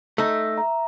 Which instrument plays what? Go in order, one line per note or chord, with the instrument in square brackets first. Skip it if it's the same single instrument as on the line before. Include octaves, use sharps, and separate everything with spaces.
[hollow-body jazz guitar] A3 D#4 [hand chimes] E6 A#6
[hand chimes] E5 A#5